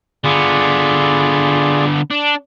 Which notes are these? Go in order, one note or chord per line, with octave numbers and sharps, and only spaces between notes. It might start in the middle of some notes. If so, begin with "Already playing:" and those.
D3 B3 F4 G#4 D5
D4